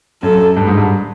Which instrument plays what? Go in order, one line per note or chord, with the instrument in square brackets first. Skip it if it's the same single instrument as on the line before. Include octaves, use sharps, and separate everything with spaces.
[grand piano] F#2 [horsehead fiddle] A4
[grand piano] G2
G#2
G2